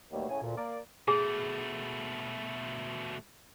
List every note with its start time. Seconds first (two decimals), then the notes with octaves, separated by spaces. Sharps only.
0.12 D#2 B2 F#3 G3 A3 A#3
0.29 A2 C#3 G#5
0.42 D2 A#2
0.55 A#3 D5
1.08 B2 A3 G#4